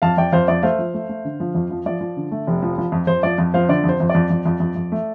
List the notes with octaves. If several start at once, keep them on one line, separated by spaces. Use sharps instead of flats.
F2 F5 A5
F2 D5 G5
F2 C5 F5
F2 D5
A3 C5 F5
F3
A3
A3
D3
F3
F2
F3
F3 D5
F3
D3
A3
F1
F3
F3
F2
F2 C5
F3 D5
F2
F3 C5 F5
D3 D5
F2
C5
F2
D5
F2
F2
F2
F2
F2
A3